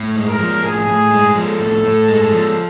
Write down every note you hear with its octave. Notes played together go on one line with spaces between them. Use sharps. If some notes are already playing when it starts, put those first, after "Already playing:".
Already playing: A2
G#3
A#4
F3
A2 G#4
A2
G#3
F3 A4
A2
A2
G#3
F3